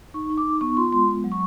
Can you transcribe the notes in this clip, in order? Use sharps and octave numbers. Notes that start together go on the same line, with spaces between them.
D#4 C#6
D#4
D6
D#4
B3 C#6
F4 C6
G#3 C6
B3
F#3
C#6